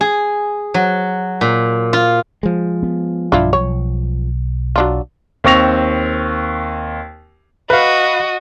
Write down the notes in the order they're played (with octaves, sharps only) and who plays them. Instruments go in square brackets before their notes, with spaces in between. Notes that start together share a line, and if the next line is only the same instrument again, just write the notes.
[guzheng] G#4
F#3
A#2
F4
[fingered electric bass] F3 G#3
[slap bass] B3
[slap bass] B1 G2 [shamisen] D4 E4 F4
[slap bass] B1 [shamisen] C#5
[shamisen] F#3 D4 F4
[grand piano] D#2 C4 C#6 A#6 F7
[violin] F#4 D#5 [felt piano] B4 F5